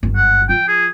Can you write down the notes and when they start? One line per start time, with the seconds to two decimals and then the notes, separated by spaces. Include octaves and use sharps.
0.03 G1 F#2
0.16 F#5
0.49 F3 F4 G5
0.68 G#4